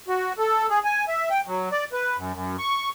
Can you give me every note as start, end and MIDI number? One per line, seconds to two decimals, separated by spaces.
0.08 0.33 66
0.38 0.67 69
0.70 0.79 68
0.84 1.04 80
1.08 1.29 76
1.30 1.41 79
1.47 1.69 54
1.71 1.85 74
1.93 2.16 71
2.17 2.33 42
2.34 2.56 42
2.58 2.89 85